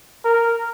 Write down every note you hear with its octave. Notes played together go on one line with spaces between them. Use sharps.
A#4